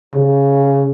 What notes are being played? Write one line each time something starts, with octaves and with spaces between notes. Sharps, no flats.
C#3